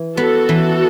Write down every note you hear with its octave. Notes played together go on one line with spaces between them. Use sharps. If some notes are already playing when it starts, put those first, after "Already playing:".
Already playing: E3
B3 F#4 A4
E3